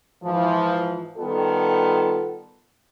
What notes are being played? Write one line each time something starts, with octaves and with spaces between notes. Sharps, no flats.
G#2 E3 F3
D#3 G3 B3 F4 A4